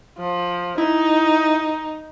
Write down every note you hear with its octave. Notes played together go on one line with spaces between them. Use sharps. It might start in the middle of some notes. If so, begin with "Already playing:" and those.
F3
D#4 E4